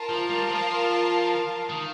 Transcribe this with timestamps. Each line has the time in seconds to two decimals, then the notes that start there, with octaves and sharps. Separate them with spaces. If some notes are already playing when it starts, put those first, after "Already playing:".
Already playing: F4 A#4 F5 A5
0.09 F3
0.29 G3
0.49 F3
1.69 D#3